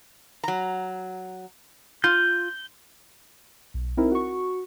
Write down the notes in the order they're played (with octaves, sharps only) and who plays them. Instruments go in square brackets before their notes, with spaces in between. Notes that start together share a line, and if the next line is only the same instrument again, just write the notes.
[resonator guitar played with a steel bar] F#3 A#5
[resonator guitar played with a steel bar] F4 [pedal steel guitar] G6
[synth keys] B1
C4 D#4 E4 A#4
F#4 C#6